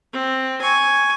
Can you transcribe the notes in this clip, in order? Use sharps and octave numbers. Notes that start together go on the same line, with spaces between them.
C4
G#5 C#6